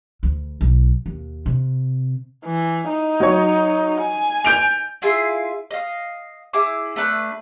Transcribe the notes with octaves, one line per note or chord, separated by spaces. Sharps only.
D2
B1
D#2
C3
E3
D#4
F#3 C#5
G#5
G6 D7 F7
E4 F4 G#4
D#5 F5
E4 G#4 D6
A3 D4 B4